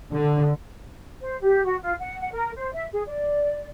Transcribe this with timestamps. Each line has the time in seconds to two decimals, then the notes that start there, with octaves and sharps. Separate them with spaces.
0.12 D3
1.20 C5
1.41 G4
1.64 F#4
1.81 F4
1.99 F#5
2.19 F#5
2.32 A#4
2.56 C5
2.73 E5
2.92 G#4
3.07 D5